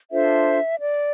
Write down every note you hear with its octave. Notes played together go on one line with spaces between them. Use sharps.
D4 F4 A4 C5 E5
D5